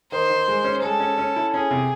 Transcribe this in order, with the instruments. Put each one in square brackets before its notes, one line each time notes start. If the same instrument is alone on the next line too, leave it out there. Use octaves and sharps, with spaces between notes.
[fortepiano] D#3 [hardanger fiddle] C5
[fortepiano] D#3
G#3
C#4
[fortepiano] G#3 [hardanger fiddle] A4
[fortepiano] C#4
C#4
E4
[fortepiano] C#4 [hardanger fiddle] G#4
[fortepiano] C3